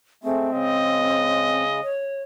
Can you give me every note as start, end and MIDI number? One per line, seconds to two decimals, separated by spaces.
0.24 0.51 56
0.24 0.51 57
0.24 1.63 60
0.52 1.81 49
0.52 1.81 56
0.52 1.92 75
1.83 2.22 73